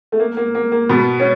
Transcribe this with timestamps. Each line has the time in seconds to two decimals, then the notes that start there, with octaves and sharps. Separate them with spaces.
0.12 A3
0.19 A#3
0.37 A#3
0.55 A#3
0.72 A#3
0.89 B2 B3
1.20 C#4